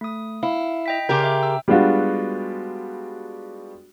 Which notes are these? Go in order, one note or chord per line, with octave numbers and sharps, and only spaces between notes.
A3 D#6
E4 F5
D#5 G5 B6
C#3 G4 A#4 C6 D6 G6
E5 G5
E6
G3 G#3 B3 D4 F4 F#4